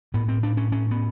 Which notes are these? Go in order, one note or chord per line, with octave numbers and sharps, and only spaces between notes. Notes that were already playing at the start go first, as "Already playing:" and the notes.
A2 B3
C4
D4
C#4
C#4
B3